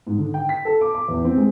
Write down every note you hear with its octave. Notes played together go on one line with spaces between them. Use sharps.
G#2
D3
G5
B6
A4
D6
D6
E2
C4
G#3